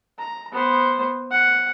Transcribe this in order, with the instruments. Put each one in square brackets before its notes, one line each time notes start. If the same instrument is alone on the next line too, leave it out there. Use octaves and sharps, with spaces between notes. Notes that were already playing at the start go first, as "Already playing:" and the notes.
[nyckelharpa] A#5
B3 C5
F#5